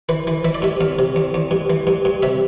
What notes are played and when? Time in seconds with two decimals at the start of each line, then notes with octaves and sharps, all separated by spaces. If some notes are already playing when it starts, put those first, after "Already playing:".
0.09 E3 B4
0.27 E3
0.45 E3 E5
0.54 D5
0.62 G2 E5
0.81 E2 F5
0.99 C3
1.16 E2
1.34 E2
1.51 G2
1.70 E3
1.87 G2
2.05 G2
2.22 C3 E5